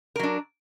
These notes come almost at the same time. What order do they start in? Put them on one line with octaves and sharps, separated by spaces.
A#4 F#3 D4